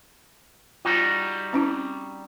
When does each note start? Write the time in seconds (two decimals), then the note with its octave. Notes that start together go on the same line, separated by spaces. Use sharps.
0.85 G3 D#4 F4 F#4
1.53 C4 C#4 E4